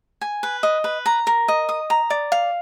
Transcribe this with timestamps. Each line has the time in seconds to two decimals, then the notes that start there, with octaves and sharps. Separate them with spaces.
0.21 G#5
0.43 B4
0.63 D#5
0.84 B4
1.06 A#5
1.27 A#4
1.48 D#5
1.69 D#6
1.90 A#5
2.10 D5
2.32 F5